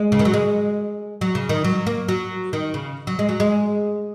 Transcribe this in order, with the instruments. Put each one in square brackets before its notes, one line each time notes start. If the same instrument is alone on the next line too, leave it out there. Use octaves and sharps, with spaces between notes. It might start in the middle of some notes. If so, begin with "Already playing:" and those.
Already playing: [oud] G#3
C#3
D#3
F#3
G#3
F#3
C#3
D#3
F#3
A#3
F#3
D#3
C#3
F#3
G#3
F#3
G#3